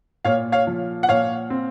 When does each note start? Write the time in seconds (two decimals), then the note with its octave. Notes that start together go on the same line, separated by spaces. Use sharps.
0.25 A#2 C#5 F5
0.52 C#5 F5
0.67 F3
1.03 F#5
1.09 A#2 C#5 F5
1.50 C4